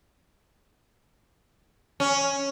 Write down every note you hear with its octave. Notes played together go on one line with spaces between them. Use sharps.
C#4